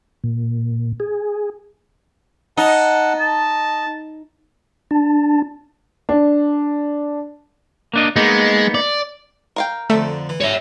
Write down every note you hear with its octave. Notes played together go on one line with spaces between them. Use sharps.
A#2
G#4
D#4 F#5 A5
D#5 A5
D4 A5
D4
A#3 D4 D#5
G#3 A#3 B3 D#4
D5
A#4 F5 G5
F2 D3 A3
E3
G3 C#5 E5